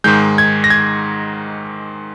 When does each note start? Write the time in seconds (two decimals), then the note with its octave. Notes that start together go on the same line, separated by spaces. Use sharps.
0.04 G#2 D#3 G#3 G6
0.38 G#6
0.64 A#6
0.70 G#6